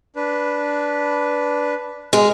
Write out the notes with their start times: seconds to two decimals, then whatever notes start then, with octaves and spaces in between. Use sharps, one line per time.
0.16 D4 B4
2.13 G#3 F6